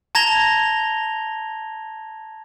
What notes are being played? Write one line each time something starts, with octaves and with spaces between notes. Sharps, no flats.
A5 A#5 G#6 A#6 F7 G7